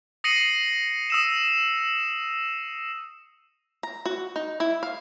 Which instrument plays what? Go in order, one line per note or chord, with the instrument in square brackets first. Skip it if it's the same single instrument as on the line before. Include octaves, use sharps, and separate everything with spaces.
[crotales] D#6 A#6 C7 C#7 D#7 F#7
D#6 E6 E7
[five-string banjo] A#5
F#4
D#4
E4
F5